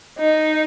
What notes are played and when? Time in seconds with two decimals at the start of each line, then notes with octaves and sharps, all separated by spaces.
0.19 D#4